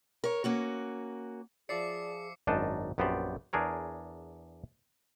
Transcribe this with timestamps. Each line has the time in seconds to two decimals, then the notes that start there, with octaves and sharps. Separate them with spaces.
0.24 A#4 C#5
0.44 A#3 C#4 F#4
1.69 F3 G#4 D5 E5 D6 C7 C#7
2.47 G#1 F#2 D4 D#4 D#5 A5
2.98 A#1 F#2 B3 G4 C5 D5
3.53 E2 D4 G#4 A#4 C#5